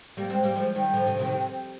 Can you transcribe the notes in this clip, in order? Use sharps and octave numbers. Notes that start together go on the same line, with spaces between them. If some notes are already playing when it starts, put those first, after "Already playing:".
G3 A#3
G#3 C4
G3 A#3
F3 G#3
D#3 G3
D3 F3
C3 D#3
C3 D#3
C3